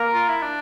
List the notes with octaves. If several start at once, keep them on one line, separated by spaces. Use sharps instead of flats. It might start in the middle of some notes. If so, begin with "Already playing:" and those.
Already playing: A#3 A#4
F4
E4
D4